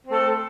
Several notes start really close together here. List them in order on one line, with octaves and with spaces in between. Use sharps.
C4 A3 A4